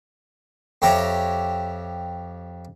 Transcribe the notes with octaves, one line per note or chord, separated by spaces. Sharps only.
F2 G4 C#5 E5 A#5